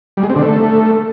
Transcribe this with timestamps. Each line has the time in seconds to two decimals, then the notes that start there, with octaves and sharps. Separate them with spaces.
0.17 G3
0.23 G#3
0.30 C4
0.36 D3
0.42 A3